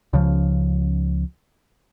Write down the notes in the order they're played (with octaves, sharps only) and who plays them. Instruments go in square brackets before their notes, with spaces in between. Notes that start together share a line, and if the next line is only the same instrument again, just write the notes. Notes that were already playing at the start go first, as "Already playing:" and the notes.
[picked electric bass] C#2 C#3 F3